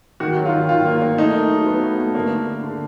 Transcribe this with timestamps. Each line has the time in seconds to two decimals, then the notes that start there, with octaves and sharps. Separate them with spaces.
0.20 D#3 F#4
0.37 F#3
0.46 F4
0.53 D#3
0.69 D#3 F4
0.85 A#3
1.02 A#3
1.18 A3 D#4
1.34 A3
1.50 F#3
1.66 F#3 B3
1.82 A3
1.99 A3
2.15 D3 A#3
2.31 D3
2.47 A#3
2.63 D3